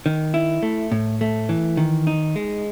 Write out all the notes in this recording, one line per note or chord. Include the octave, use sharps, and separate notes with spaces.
D#3
E4
A3
A2
A3
E3
D#3
D#4
G#3